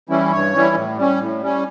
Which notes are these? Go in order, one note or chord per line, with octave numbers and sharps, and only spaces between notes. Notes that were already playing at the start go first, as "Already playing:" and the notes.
E3 G3 C#4 E4
G2 C#5
E3 G3 C#4 E4
A2
G3 C#4
A2
G3 C#4